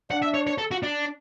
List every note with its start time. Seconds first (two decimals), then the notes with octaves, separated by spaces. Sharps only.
0.11 D4 F#5
0.23 E5
0.35 C#5
0.47 C#5
0.58 A4
0.71 F#4
0.83 D4